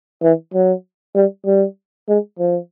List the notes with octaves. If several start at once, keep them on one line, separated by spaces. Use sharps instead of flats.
E3
F#3
G3
G3
G#3
F3